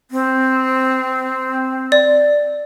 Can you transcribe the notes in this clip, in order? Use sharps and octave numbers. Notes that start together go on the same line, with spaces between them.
C4
D5